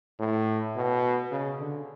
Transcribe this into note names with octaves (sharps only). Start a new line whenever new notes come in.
A2
B2
C#3
D3